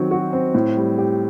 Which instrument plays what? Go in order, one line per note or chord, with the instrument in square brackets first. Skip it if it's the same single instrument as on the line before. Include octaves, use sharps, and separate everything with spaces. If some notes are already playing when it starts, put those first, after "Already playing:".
Already playing: [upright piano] D#3 F#3 C4
F#4
C4
A2
G3
G4